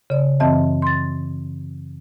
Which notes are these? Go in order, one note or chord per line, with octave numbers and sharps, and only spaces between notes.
C#3 D5
F#2 E3 C4 D#5 E5 A5
C6 A6